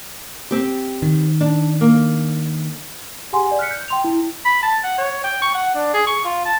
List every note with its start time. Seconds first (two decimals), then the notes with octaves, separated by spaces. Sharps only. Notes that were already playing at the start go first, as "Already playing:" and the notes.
0.51 C4 G4
1.02 D#3
1.41 D4
1.81 A#3
3.33 G4 G#4 F#5 G#5 C6
3.47 D5 G#5
3.59 F6 F#6 B6 C#7
3.71 G6
3.88 G5 C6 F7
4.04 E4
4.45 B5
4.63 A5
4.84 F#5
4.98 C#5
5.24 G5
5.42 C#6
5.54 F#5
5.75 D4
5.94 G#4
6.07 C#6
6.25 F4
6.46 A5